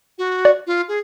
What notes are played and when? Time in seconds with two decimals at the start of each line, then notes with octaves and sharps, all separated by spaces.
0.18 F#4
0.45 D5
0.67 F4
0.88 G#4